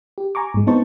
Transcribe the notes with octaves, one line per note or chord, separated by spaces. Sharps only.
G4
G#5 A#5 C#6 D6
G#2 G#3
B3 C4 D#4 C5 A5 C#6